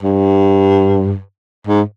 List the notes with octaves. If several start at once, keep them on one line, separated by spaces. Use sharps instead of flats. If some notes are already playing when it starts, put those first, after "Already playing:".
G2
G#2